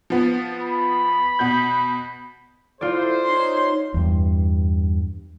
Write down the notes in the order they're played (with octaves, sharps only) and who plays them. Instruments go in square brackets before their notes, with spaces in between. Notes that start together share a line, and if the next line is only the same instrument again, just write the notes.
[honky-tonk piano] F3 B3
[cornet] B5
[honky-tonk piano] B2 F#4 G6
[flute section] E4 A4 [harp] F4 D5 [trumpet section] C5
[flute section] D#4 C#5 [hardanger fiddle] C6
[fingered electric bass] E2 G2